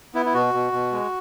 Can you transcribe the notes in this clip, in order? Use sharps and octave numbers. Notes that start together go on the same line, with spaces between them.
B3 E4
E4
B2 F#4
B2
B2
G#3